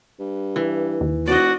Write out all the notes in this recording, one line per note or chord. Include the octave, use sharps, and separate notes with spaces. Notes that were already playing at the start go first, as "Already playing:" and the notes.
G2
E3
D#2
F1 F#4 D5 D#5